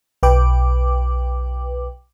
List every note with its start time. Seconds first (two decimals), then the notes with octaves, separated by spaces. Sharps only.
0.23 B1 B4 G5 D6